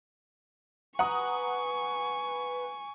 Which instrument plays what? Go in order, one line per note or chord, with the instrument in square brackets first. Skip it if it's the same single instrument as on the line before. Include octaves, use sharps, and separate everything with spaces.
[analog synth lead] B4 [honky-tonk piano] F#5 A#5 D#6 [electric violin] G#5 C#6